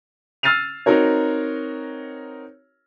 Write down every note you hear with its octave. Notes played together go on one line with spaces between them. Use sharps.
E6 F6 A6 C7 D#7 F7
C4 D#4 F#4 A#4 C#5